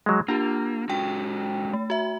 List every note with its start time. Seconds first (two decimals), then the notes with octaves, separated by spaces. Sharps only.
0.06 F#3 G#3
0.28 A#3 D4 F4 G4 A#5
0.90 G#3 C#4 F#4 G5
1.73 A3
1.90 F#4 E5